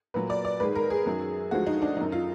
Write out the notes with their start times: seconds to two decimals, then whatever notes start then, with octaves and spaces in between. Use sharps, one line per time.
0.14 A#2 F#3 B4
0.30 D5
0.45 D5
0.60 G#2 D#3 G#3 B4
0.75 A#4
0.90 G#4
1.06 F#2 D#3 F#3
1.51 D2 D3 F3 G#3 F#4
1.67 D#4
1.82 D4
1.97 F#2 D#3 F#3 D#4
2.12 F4